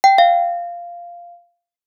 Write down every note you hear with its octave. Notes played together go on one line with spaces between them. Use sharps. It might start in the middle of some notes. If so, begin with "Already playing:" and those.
G5
F5